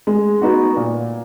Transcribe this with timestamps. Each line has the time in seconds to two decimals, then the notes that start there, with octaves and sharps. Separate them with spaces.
0.07 G#3
0.42 B3 D#4 F#4
0.77 A#2